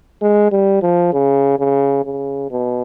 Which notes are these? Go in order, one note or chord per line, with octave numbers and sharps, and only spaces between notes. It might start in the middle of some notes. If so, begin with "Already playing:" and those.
G#3
G3
F3
C#3
C#3
C#3
B2